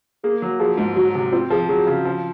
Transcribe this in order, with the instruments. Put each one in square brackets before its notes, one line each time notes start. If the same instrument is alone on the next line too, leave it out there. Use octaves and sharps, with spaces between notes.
[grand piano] A#3 [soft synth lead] G#4
[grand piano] F#3
[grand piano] F3 [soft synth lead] G#4
[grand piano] G#2
[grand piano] F#3 [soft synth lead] F#4
[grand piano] C3
[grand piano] C4 [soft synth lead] F4
[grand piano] F3 [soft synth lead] G#4
[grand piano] F#3 [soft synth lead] G#4
[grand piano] C#3
F3